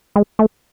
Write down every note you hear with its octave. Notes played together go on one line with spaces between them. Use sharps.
G#3
A3